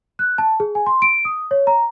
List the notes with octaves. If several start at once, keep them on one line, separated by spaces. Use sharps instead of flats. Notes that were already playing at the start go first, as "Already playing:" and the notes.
F#6
A5
G#4
G#5
C6
D7
D#6
C#5
A#5